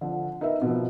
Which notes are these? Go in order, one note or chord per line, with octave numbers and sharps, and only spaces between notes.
D3 F3
D#4 A#4 B4 E5
B2 F3